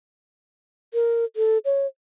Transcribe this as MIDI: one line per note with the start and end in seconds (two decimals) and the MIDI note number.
0.94 1.25 70
1.36 1.58 69
1.65 1.87 73